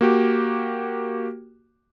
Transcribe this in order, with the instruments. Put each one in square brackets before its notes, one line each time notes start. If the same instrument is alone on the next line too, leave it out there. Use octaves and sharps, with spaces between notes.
[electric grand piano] A#3 F#4 G4